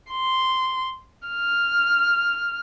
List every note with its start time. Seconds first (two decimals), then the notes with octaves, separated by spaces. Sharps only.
0.11 C6
1.28 F6